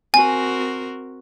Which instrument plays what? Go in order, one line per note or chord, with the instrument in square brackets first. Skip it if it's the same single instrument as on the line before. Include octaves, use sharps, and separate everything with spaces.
[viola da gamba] C4 F#4 A#4 [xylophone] G#5